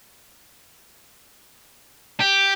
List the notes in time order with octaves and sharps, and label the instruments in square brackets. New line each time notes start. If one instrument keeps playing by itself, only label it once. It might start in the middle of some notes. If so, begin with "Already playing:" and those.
[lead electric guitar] G4